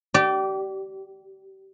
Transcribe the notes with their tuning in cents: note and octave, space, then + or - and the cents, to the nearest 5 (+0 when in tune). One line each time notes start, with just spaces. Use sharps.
G4 -30 D5 +0